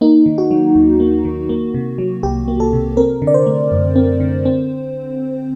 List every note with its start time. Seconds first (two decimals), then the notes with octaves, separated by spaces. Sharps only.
0.01 A#3 D#4
0.26 D#3
0.38 F#4
0.51 F#3
0.75 D#2
1.00 A#3
1.25 D#3
1.49 A#3
1.74 C3
1.98 F#3
2.23 C2 G4
2.48 A#3
2.60 A4
2.73 C3
2.97 C4 A#4
3.22 D3
3.27 D5
3.34 C5
3.46 A3
3.72 F#2
3.96 C4
4.20 D3
4.45 C4